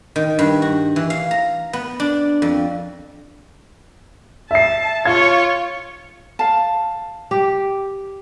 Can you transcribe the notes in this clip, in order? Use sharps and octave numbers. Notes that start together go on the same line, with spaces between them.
D#3
G2
F#4
E3
F5
A#5
B3
D4
F2
E5 A5 C7
F4 C#5 F5 G#6
F5 A5
G4